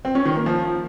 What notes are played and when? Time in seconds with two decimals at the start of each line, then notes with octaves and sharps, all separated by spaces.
0.05 C4
0.15 C#4
0.25 D#3
0.36 A#3
0.46 F3